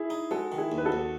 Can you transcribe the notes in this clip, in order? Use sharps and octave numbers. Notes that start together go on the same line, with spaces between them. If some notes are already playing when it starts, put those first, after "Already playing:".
Already playing: E4 G#4
D#4
G#3 F#4 A4
D#3
E4 G#4
D#2
B4
F#4 A4
D#2